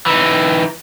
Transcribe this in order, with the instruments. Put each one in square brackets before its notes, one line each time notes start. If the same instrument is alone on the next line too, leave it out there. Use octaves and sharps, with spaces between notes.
[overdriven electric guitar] E3 D#4